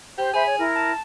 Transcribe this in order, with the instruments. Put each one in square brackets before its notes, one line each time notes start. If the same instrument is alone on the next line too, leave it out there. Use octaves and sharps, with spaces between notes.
[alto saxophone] G4 [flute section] C5
[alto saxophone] G#4 [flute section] C5 E5 B5
[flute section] C#5
E4 A#4
[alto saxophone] A5